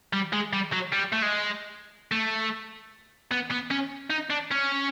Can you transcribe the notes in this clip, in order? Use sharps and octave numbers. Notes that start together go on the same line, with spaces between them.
G3
G#3
G3
F#3
G3
A3
G#3
A3
B3
B3
C#4
D#4
D4
C#4